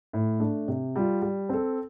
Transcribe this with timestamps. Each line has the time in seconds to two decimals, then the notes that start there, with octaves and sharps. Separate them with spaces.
0.13 A2
0.40 A3 D4
0.68 C3
0.96 G3 F4
1.22 G3
1.49 C4 A4